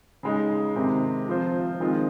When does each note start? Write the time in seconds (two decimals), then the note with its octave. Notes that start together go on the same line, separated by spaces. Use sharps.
0.23 C#3 G#3 D#4
0.75 C3 D#3 G#3 C4
1.28 F3 C4 F4 C5
1.80 D#3 G#3 C4 F4